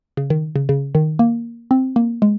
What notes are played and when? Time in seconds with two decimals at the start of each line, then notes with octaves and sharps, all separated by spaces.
0.17 C#3
0.30 D#3
0.56 C#3
0.69 C#3
0.95 D#3
1.19 A#3
1.71 C4
1.96 A#3
2.22 G#3